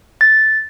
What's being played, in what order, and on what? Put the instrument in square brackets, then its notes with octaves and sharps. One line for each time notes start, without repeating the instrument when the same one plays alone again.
[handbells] A6